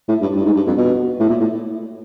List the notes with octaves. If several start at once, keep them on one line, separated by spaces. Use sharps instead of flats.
A2
G2
G2
G#2
G2
F2
B2
A2
A#2
A2